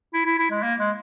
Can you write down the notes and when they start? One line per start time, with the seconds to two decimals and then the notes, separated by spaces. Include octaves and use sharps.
0.13 E4
0.26 E4
0.38 E4
0.51 G#3
0.62 A#3
0.79 G#3